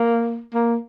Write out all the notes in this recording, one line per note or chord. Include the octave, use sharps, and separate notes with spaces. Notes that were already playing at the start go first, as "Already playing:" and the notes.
Already playing: A#3
A#3